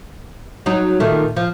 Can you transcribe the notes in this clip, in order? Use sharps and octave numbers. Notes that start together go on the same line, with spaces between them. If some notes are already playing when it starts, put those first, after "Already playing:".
F#3 D#4
A#2 D#3 A3
F3